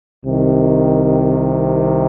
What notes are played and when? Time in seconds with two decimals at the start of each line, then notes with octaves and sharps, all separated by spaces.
0.25 C2 C3 D#3